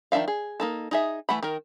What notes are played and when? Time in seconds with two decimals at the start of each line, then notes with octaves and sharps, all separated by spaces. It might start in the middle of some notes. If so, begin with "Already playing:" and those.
0.12 D#3 F3 D4 E5 F5
0.28 G#4
0.60 A#3 D#4 A4
0.91 D#4 G#4 E5
1.29 E3 A3 F#5 B5
1.43 D#3 A#4